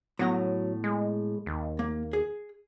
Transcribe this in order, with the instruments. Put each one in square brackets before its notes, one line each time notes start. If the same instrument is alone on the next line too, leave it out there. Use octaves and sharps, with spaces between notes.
[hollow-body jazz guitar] A2 B3 A#5 [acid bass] F#3
[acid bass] G#3
D#2
[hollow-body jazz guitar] A#3
G#4